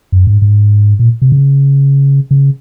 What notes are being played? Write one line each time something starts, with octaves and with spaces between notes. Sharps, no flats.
F#2
G#2
G#2
A#2
C3
C#3
C#3